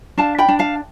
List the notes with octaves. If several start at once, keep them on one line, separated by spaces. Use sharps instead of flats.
D4 F5 A5
G5 B5
D4
F5 A5